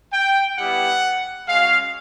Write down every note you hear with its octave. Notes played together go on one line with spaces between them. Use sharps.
G5
G3 B3 E4 G4 F#5
G#3 C#4 F#4 F5